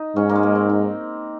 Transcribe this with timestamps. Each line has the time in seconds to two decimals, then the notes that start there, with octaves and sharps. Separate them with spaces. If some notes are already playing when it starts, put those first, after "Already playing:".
Already playing: D#4
0.16 G#2 C#4
0.29 A#3
0.35 G#3
0.43 A#3
0.55 C4
0.69 D#4